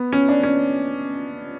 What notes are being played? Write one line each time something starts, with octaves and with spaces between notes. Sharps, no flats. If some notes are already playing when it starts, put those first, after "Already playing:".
Already playing: B3
C#4
D4
C#4